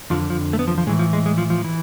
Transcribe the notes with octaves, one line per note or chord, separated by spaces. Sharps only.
F2 D3 F3
F3
A3
B3
F3
F3
A2 E3 G#3
F3
G#3
G#3
F3
F3
E3